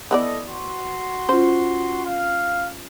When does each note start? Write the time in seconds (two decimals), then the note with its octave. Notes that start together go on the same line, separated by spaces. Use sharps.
0.11 E3 B3 A4 D5 D#5
0.48 F#4 C6
1.29 C#4 F4 C5
2.05 F5